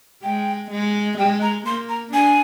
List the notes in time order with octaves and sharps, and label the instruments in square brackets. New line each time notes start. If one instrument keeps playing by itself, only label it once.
[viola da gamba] G#3 [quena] G5
[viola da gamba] G#3
[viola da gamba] G#3 [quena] G5
[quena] A#5
[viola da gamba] A#3 [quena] C6
[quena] A#5
[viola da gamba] D4 [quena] G#5